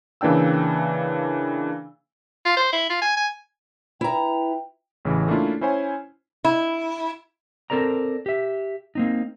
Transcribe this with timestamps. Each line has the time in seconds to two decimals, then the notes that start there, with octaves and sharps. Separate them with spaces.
0.21 C#3 E3 A#3 D4 G5 E6
2.45 F4
2.56 C5
2.73 E4
2.90 F4
3.02 G#5
3.17 G#5
4.01 E4 B4 E5 G5 A#5
5.05 A1 C#3 E3
5.28 A3 A#3 C#4 D4 E4 F4
5.61 C#4 E4 C5 C#5 G#5
6.44 E4
7.70 C4 A4 A#4 D5 A#5
8.26 G4 E5
8.95 A#3 C4 D#4